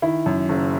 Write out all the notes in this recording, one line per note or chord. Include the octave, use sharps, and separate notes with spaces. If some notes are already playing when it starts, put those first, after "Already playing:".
D#3 E4
F#2
F#1